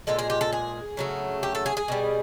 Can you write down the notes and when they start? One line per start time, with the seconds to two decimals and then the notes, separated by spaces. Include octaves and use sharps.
0.07 A#2 F3 G#3 A4
0.19 G#4
0.30 G4
0.41 A4
0.52 G#4
0.97 C#3 F#3 A3
1.43 G4
1.55 A4
1.66 G#4
1.77 G#4
1.88 B2 G3